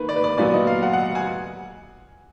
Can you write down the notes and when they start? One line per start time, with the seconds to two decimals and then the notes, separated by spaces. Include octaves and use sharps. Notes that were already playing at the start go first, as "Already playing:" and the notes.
Already playing: D#3 A#3 B4
0.09 D5
0.16 B4
0.24 D5
0.38 A#2 F#3 B3 D5
0.53 D#5
0.67 F5
0.82 F#5
0.93 F#5
1.15 G#5